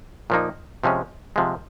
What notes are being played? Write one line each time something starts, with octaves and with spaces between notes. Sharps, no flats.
A#2 F3 A#3 D#4
C3 F3 G#3 C#4
C3 F3 G#3